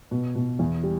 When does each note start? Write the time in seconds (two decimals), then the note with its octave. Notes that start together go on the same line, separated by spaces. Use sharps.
0.11 B2
0.35 B2
0.59 E2
0.83 G3